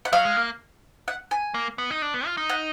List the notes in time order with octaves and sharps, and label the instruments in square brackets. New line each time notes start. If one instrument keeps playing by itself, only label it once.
[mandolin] F#5
[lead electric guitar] F#3 [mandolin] F5
[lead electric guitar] G#3
A#3
[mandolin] F#5
G#5
[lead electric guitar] A#3
B3
D#4
D4
B3
F4
D#4
[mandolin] F#5